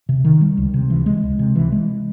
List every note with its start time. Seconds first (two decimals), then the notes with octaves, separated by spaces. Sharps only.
0.09 C3
0.24 D#3
0.41 G3
0.57 C#2
0.74 C3
0.90 E3
1.06 G#3
1.23 C#2
1.39 C3
1.56 E3
1.72 G#3